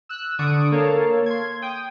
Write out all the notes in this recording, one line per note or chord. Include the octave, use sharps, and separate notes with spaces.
E6 F#6
D3 D5 C#6 D#6 D7
A#3 A4 C#5 F5 A5
C6 G#6
G5 D#6